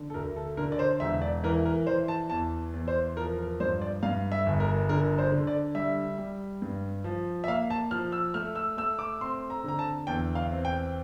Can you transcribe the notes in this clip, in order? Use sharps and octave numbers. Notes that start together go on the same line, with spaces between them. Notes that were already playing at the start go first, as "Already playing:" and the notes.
Already playing: D3
A4
D2 A#4
A4
D3 A#4
D5
C5
E1 E5
D5
E3 A#4
A#4
E3 C5
A5
E2 A5
E2
C5
F3 A#4
A#4
G2 C5
D5
G2 F5
E5
G1
A#4
D3 A#4
C5
D3
D5
G3 E5
G3
G2
F3
E5
A#3 F5
A5
F3 F6
E6
A3 F6
E6
A3 E6
D6
C4 C6
A#5
D3 A#5
A5
E2 G5
F5
C4
G5